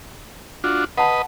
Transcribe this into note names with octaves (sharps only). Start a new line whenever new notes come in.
D4 F4 F#4
B4 D#5 F#5 A5 B5